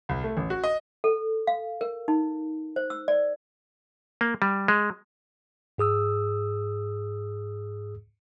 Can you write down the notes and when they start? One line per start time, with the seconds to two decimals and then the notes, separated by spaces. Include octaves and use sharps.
0.09 C2
0.23 A3
0.37 A1
0.50 F#4
0.63 D#5
1.04 A4
1.47 F5
1.81 A#4
2.08 D#4
2.76 C5
2.90 E6
3.08 D5
4.21 A#3
4.42 G3
4.68 G#3
5.78 G#2 G#4 D#6 E6